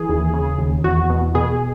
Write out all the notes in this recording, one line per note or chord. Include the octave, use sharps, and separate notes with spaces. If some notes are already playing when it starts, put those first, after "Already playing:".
Already playing: E3 G#4
D#2
C#3
D#2
E2 F#4
B2
B2 G#4